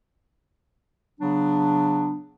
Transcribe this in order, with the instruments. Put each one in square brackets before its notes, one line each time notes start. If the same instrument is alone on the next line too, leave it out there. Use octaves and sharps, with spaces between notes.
[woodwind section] C#3 F#3 B3 D4